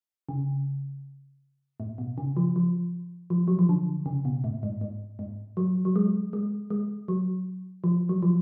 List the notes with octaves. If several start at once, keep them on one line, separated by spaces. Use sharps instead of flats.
C#3
A2
B2
C#3
F3
F3
F3
F#3
F3
D3
C#3
B2
A2
G#2
G#2
G#2
F#3
F#3
G#3
G#3
G#3
F#3
F3
F#3
F3